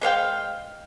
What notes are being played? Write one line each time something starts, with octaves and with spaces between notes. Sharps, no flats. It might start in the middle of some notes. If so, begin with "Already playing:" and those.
G#3 C5 F5 G5